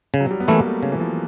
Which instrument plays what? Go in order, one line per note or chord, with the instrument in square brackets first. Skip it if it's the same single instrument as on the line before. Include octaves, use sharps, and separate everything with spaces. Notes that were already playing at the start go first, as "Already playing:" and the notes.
[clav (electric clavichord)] C#3
[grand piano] F#3
G3
B3
[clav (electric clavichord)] E3 A3 C#4 E4 [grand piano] A#3
[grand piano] A3
[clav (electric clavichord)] C#3
[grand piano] E3
F3